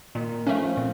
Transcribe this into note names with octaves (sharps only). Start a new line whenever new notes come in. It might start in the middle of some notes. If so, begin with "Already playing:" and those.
A#2 D#3
F3 A3 C#4
A#2 C4